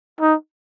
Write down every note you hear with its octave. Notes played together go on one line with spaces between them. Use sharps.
D#4